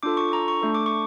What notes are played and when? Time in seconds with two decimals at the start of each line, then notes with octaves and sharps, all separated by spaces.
0.03 D4 F4 A4 D6
0.17 C#6
0.33 A#5
0.48 C#6
0.62 A3 D4 A4
0.75 D6
0.86 C#6